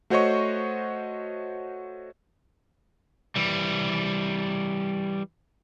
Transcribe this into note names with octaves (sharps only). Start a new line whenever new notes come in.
A3 F#4 C5 C#5 D#5 C#6
E3 G3